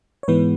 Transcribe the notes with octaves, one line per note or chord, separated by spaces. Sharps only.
C#5
G#2 E3 G#3 B3 B4